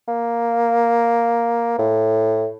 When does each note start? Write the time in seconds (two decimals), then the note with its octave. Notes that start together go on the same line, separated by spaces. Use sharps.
0.08 A#3
1.78 A2